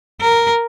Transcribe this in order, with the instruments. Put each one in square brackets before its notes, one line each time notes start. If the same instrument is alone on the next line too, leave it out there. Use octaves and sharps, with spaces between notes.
[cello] A#4